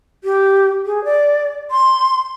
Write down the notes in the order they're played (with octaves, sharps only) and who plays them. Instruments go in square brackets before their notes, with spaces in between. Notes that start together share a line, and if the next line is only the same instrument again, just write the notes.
[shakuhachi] G4
G#4
D5
C6